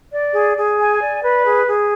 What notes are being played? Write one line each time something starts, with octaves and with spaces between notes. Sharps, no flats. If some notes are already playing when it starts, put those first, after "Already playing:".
D5
G#4
G#4
G#5
D5
B4
G#4
G#4